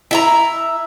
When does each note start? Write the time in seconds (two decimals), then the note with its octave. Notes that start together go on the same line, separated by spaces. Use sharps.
0.11 E4 E5 A#5